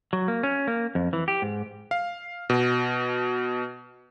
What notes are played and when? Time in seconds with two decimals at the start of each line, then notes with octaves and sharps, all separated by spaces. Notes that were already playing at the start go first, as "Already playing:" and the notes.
0.13 F#3
0.28 A#3
0.43 C#4
0.67 A#3
0.95 F2
1.13 E3
1.28 G4
1.42 G#2
1.91 F5
2.50 B2